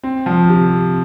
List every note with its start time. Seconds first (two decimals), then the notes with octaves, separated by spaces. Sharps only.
0.03 C4
0.26 F3
0.49 C3